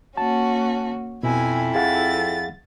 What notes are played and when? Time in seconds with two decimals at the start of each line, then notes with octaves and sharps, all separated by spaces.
0.17 A#3 C#4 F#4 A5
1.23 F2 B2 E4 G#5
1.75 G#4 F5 F#5 A6